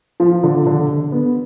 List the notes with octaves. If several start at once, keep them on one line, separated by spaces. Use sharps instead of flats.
F3
D3
D3
D3
B3